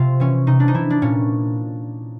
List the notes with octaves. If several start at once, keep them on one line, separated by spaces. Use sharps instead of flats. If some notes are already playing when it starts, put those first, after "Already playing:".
Already playing: C3 F4
E3 C#4
C3 D#4
D4
D#4
E3 E4
D4
A#2 C#4